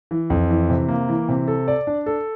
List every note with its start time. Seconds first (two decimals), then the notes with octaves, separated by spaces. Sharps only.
0.11 E3
0.30 F2
0.50 E3
0.70 C3
0.88 A#3
1.09 E3
1.29 C3
1.48 A4
1.68 D5
1.87 D4
2.06 A4